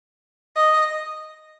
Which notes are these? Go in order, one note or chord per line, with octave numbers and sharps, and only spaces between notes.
D#5